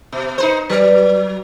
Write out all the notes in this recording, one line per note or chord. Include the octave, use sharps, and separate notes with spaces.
B2
D#4 B4 C5
F#3 B4 D5